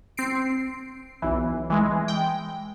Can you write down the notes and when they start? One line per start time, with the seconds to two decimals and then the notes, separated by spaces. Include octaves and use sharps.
0.17 C4 C7 D7
1.22 B1 E3
1.70 E3 G#3
2.08 G5